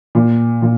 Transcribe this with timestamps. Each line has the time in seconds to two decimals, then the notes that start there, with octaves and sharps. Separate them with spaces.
0.15 A#2
0.62 A#2